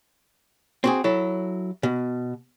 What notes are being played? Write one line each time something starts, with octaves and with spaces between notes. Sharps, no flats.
C4 F#4 G#4
F#3 E4 A4
B2